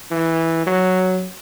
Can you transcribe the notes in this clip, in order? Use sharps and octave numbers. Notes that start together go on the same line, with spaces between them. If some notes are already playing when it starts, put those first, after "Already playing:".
E3
F#3